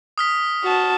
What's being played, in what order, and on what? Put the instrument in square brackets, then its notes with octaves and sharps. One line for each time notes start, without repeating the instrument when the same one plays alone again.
[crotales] D#6 F6 B6
[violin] F#4 A5